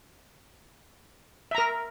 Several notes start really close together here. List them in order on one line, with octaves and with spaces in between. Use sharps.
E5 A#5 A#4